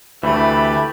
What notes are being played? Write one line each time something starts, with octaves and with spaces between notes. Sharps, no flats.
D2 E3 A3 G4 B5